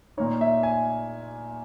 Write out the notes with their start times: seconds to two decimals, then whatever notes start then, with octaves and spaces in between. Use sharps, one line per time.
0.17 A#2 A#3 D#4 C#5
0.41 E5
0.63 G#5